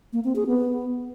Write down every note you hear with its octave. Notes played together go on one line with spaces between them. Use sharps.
A#3
C4
G#4
B3